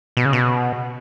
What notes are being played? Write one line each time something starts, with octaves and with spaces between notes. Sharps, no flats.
B2
C#3
B2